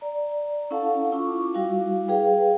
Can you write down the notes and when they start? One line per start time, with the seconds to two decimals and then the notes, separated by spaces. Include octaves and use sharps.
0.01 D5 A#5
0.71 C#4 E4 A4 F5 F#5 A5
1.12 E4 F4 C#6 D6
1.54 G3 E4 F#4 F5 D6
2.08 G#4 B4 F5 G5